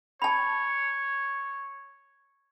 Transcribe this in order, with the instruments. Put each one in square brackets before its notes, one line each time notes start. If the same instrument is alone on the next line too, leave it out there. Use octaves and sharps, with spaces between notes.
[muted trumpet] C#5 [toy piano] A5 B5